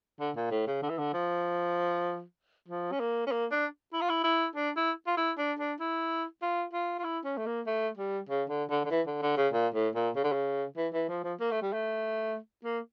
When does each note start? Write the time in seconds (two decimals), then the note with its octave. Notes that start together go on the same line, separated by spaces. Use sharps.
0.20 D3
0.36 A#2
0.51 A2
0.67 C#3
0.82 D3
0.90 E3
0.98 D3
1.13 F3
2.68 F3
2.92 C#4
3.00 A#3
3.27 C#4
3.31 A#3
3.51 D4
3.93 E4
4.01 F4
4.09 E4
4.24 E4
4.55 D4
4.76 E4
5.07 F4
5.17 E4
5.38 D4
5.59 D4
5.80 E4
6.42 F4
6.73 F4
6.99 F4
7.04 E4
7.25 C#4
7.37 A3
7.46 A#3
7.66 A3
7.97 G3
8.29 C#3
8.49 D3
8.70 D3
8.85 D3
8.90 E3
9.07 D3
9.22 D3
9.37 C#3
9.53 A#2
9.74 A2
9.95 A#2
10.16 C#3
10.24 D3
10.32 C#3
10.77 E3
10.93 E3
11.09 F3
11.23 F3
11.40 A#3
11.51 A3
11.62 G3
11.73 A3
12.64 A#3